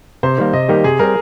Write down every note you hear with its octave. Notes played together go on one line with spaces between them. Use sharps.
C3 C5
D#3 G3 A#3
C3 D#5
D#3 G3 A#3 G4
C3 G#4
G3 C4 A#4